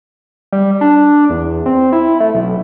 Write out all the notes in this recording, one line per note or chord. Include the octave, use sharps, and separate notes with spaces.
G3
D4
E2
C4
E4
A3
B1